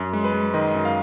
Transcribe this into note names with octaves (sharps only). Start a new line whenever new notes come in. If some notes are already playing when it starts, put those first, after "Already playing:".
Already playing: F#2
G#3
B4
G#3
D#3 D#5
F#2
F5